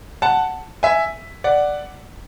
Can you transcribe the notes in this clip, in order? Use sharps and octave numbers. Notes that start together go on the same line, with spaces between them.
F#5 A5
E5 G#5
D5 F#5